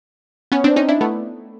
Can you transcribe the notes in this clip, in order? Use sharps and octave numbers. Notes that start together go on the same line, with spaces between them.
B3 C#4
C4 D4
C#4 D#4
D4 E4
A3 B3